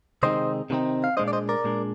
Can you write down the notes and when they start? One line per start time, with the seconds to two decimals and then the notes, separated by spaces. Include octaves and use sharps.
0.23 C3 D#3 G#3 C4 D#4 C5 D#5
0.70 C3 D#3 G#3 C4 D#4
1.04 F5
1.17 A#2 G#3 D4 C5 D#5
1.28 D5
1.33 C5 D#5
1.49 A#4 D5
1.64 A#2 G#3 D4